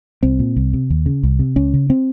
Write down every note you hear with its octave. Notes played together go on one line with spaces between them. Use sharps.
C2 C4
A#2
C2
C3
D#2
C#3
C2
C3
C#2 C#4
C#3
C4